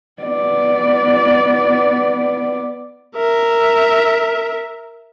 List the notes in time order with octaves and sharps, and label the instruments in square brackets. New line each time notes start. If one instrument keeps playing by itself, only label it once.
[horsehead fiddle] B3 D5
[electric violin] A#4 E5